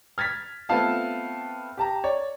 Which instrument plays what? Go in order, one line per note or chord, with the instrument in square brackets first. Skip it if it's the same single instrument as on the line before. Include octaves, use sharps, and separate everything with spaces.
[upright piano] F6 G#6 A6 B6
A3 B3 C4 F4 F5 A5
G4 A5 A#5
C#5 D5